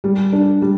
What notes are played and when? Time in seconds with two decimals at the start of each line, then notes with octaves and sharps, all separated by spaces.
0.04 G3
0.33 D4
0.62 G3